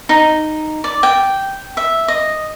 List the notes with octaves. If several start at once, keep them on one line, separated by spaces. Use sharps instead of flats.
D#4
D5
G5
E5
D#5